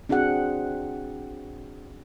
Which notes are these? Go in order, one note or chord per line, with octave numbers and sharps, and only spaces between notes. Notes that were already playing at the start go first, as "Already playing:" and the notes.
C4 D4 F#4 G#4 F#5